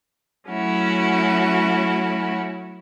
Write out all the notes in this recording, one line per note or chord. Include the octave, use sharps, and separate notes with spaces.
F#3 A3 C#4 E4 F#4